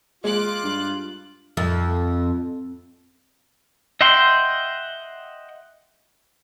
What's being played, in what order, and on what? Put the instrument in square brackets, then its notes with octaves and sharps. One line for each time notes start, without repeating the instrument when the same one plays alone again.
[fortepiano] G#3 [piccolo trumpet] F4 [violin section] D6 F#6
[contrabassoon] G2
[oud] F2
[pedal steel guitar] D#5 E5 F#5 G5 C6